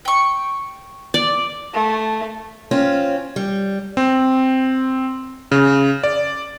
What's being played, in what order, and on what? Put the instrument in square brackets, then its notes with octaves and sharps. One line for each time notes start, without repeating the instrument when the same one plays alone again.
[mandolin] G5 C#6
[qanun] D5
[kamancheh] A3
[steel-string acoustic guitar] C4 C#4 F4
G3
[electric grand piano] C4
C#3
D5